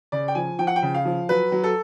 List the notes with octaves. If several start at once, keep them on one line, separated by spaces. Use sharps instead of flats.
C#3 D5
G5
F3 G#5
F3 G5
F#5
G5
C#3
F5
F3
F#3 B4
F#3
A4